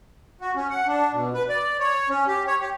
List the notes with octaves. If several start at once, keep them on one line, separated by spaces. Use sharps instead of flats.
F#4
C#4
F#5
D4
B2
B4
D5
C#5
C#4
G4
C#5
G4